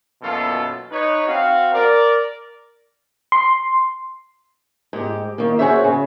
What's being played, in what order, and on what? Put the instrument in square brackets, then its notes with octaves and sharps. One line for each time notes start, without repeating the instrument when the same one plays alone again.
[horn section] F#2 B2 E3 A#3 F4 A4
D#4 B4 C#5
C4 F#4 F5
A#4 D5
[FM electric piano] C6
[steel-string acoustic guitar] G#2 G4
D#3 A#3
F#4 G#4 A#4 C5 C#5 E5
C#3